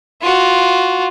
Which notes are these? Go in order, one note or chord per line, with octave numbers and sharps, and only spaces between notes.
F4 F#4